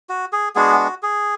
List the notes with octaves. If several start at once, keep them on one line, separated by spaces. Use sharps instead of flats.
F#4
G#4
G#3 B3 D4 F#4 G#4
F#4
G#4